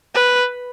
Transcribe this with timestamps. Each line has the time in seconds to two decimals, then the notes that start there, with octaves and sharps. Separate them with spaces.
0.14 B4